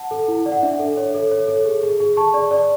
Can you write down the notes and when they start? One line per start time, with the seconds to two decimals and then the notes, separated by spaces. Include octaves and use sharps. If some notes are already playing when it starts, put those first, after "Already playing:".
Already playing: F#5 A5
0.11 A4
0.28 E4
0.46 D5
0.52 F#5
0.63 D4 E5
0.79 A4
0.97 C#5
1.14 A4
1.31 C#5
1.48 A4
1.65 G#4
1.83 G#4
2.00 G#4
2.17 G#4 A5 C#6
2.34 D5
2.51 D5